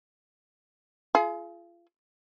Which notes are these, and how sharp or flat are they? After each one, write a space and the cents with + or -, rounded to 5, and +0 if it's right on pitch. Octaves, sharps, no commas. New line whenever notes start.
F4 -30 G#4 +30